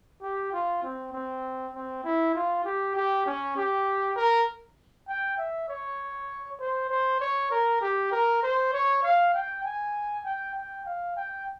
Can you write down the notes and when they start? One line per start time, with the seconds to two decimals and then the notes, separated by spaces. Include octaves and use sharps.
0.21 G4
0.52 F4
0.83 C4
1.12 C4
1.74 C4
2.04 E4
2.34 F4
2.64 G4
2.95 G4
3.26 C#4
3.56 G4
4.16 A#4
5.08 G5
5.38 E5
5.68 C#5
6.59 C5
6.90 C5
7.20 C#5
7.51 A#4
7.81 G4
8.12 A#4
8.43 C5
8.73 C#5
9.03 F5
9.33 G5
9.64 G#5
10.24 G5
10.55 G5
10.85 F5
11.16 G5